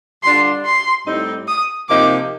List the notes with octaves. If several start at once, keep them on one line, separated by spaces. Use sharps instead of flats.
D3 G3 D4 F4 C6
C6
A2 G3 C4 D#4
D#6
C3 F3 A#3 D#4 D6